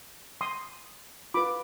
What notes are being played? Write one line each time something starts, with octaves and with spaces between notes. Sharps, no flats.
C6 D#6
F4 B4 B5 D6